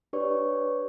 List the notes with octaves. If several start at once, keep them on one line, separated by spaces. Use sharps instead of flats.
D4 G4 B4 C#5 D5 C#6